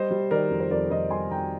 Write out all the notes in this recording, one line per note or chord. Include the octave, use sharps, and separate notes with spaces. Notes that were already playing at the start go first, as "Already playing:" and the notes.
Already playing: G3 C5 D#5
G3
D#3 A#4 D5
F2
C5
F2 A#4 D5
F2 C5 D#5
G3 G#5 C6
D#3 G5 A#5